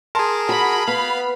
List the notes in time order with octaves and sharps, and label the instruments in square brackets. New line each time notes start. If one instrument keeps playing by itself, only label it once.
[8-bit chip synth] G#4 A#4 [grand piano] A5 C6
[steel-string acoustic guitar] F#4 [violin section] B5
[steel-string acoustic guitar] B3 [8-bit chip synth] F5